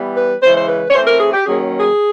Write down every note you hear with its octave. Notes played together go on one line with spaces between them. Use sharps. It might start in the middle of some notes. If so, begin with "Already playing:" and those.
Already playing: E3 G3 B3
B4
C#3 E3 G#3 C5
C5
B4
C#5
E3 A3 C4 C5
A#4
G#4
G4
D#3 F#3 A#3 C#4 G#4
G#4